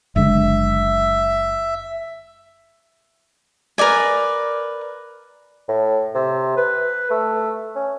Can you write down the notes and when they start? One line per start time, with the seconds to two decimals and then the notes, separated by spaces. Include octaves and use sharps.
0.16 F#1 D3 G#3 E5
3.78 A#4 B4 D5 G#5
5.68 A2
6.14 C3
6.57 B4
7.10 A3
7.75 C#4